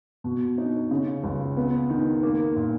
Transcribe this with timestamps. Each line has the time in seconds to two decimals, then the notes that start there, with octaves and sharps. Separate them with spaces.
0.24 B2
0.58 D#4
0.91 C#3
1.24 C#2
1.57 B3
1.90 D#3
2.23 A#3
2.56 A#2